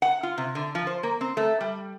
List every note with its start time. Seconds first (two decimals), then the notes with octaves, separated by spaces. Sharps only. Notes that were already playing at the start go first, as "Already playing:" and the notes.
0.02 F#5
0.23 F4
0.38 C3
0.55 D3
0.75 F3
0.87 C5
1.03 A#3
1.21 C4
1.37 A3
1.61 G3